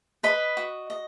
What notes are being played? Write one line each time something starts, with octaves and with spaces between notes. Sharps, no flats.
B4 D#5 B5
F#4
D#5